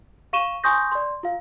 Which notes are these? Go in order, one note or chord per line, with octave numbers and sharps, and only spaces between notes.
F5 C#6 D#7 E7 G7
G#5 C6 C#6 D#6 G6 A#6
D5 C6
F4 F5